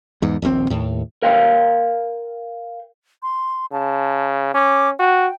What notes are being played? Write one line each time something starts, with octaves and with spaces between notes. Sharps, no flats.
E2 G#2
D#1 A#1 A#2 C4
D#2 A2
A#4 F5 G5 C6
C6
C#3 A5
C#4 D6
F#4 G5